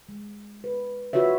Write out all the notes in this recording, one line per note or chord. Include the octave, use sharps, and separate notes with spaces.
G#3
B4
F4 F#4 B4 C#5 E5